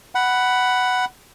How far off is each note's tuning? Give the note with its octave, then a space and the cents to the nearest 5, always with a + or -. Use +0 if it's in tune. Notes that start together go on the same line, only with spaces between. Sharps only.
F#5 +10 B5 +0